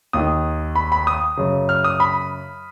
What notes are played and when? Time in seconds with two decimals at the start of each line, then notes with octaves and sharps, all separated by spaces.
0.13 D#2 D#3 D#6
0.75 B5
0.92 B5
1.07 D#6
1.37 F#2 C#3
1.69 F6
1.84 D#6
2.00 B5